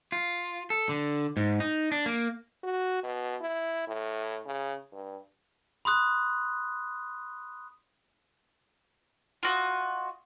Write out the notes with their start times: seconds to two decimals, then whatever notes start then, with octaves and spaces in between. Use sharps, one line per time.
0.12 F4
0.70 A4
0.89 D3
1.37 G#2
1.60 D#4
1.92 D4
2.06 A#3
2.63 F#4
3.03 B2
3.41 E4
3.88 A2
4.46 C#3
4.92 G2
5.85 B5 C6 D#6 F#6
9.43 F4 F#4 D#5